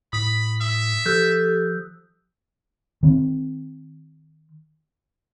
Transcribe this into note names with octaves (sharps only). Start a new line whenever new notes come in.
A2 B5 D#6 B6
E5 D#6
F3 G4 A4 E6 F#6 G6
D#3 C4